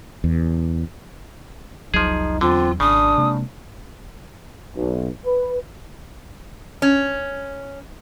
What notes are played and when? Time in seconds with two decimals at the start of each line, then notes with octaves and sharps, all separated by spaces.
0.24 E2
1.94 F1 C2 F3 F#3 D#4 G#4
2.41 E2 D3 F#3 C4 F4
2.80 G#1 C#3 D4 D#6
3.18 C3 G#3 A#3
4.76 B1
5.26 B4
6.82 C#4